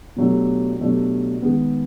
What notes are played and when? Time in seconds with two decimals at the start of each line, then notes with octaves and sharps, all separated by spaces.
0.16 B2 F#3 A3 D4 G4
0.80 B2 F#3 A3 D4 G4
1.42 D#3 G#3 B3